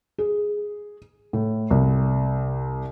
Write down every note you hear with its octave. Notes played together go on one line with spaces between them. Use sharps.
G#4
A2
C2